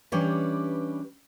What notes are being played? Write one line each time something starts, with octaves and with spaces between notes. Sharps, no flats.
E3 G3 C#4 D4 G4 B4